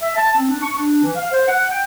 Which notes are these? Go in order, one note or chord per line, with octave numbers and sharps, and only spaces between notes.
E5
A5
C4
D4
C#6
D4
E3
F5
C5
F#5
G5